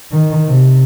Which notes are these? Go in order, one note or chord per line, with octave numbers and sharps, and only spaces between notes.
D#3
C3